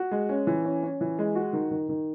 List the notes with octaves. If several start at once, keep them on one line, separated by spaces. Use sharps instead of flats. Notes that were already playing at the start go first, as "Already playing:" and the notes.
Already playing: F#4
G#3
C#4
E3
C#4
C#4
E3
G#3
F#4
D#3
D#3
D#3